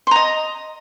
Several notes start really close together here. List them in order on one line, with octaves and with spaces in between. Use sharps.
C6 A#5 D#5